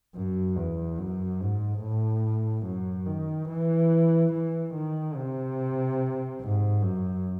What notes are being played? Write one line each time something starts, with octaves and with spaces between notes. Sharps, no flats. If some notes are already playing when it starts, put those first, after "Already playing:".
F#2
E2
F#2
G#2
A2
F#2
D#3
E3
E3
D#3
C3
G#2
F#2